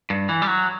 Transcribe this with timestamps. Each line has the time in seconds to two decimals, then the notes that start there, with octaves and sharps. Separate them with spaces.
0.10 G2
0.29 E3
0.42 G3
0.47 F#3